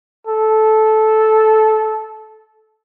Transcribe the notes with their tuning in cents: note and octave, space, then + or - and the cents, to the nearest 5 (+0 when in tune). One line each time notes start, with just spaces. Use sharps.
A4 -15